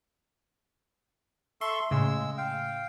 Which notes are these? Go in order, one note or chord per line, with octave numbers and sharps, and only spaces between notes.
A4 E5 C6 C#6
A2 C#3 G#3 E6
F5 G5